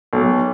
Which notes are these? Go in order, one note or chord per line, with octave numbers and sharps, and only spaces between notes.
B1